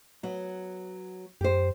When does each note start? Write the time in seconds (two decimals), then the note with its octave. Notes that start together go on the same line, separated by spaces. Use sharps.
0.23 F#3 B3
1.41 F#2 G4 C5